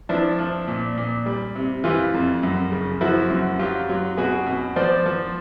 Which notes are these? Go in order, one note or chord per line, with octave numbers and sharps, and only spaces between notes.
F3 D4 E4
F3
A#2
A#2
G3
C3
E3 F4 G4
F2
F#2
C#3
F3 E4 F#4
F#2
F#3 F4 G4
F#3
B2 F#4 G#4
B2
F3 C5 D5
F3